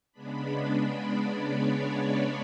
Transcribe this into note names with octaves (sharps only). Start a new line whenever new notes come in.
C#3 G#3 B3 D4 B5
D5
C#5
D5